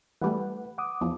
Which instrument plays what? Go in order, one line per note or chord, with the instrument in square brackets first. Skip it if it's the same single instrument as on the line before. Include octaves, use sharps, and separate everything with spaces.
[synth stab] E3 G3 A3 [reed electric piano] B4 F#5
[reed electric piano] F#5 D6 D#6
[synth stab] E2 F3